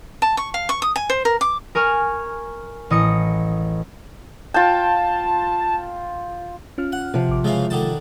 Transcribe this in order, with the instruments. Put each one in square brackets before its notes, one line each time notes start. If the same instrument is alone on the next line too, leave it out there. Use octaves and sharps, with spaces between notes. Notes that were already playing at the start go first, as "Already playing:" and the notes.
[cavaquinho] A5
C#6
F5
C#6
D#6
G#5
C5
A#4
D6
[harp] A#4 G#5 C#6 F6
A1 D#5 D#6 C#7
[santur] F4 G5 [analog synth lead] A5
[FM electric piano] C#4 F4 F6
[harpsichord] F#5
[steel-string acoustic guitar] C3 F3
[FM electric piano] A1 D6
[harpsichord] C#3 E3 F5 [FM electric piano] G#3
[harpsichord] D3 D#3 A5